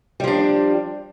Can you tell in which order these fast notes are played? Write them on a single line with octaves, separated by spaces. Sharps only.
G3 F3 D4